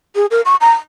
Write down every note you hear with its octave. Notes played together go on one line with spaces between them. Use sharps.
G#4
A#4
C#6
A#5